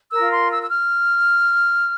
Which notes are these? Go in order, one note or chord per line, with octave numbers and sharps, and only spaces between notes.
F4 A#4 E6
C6
E6
E6
F6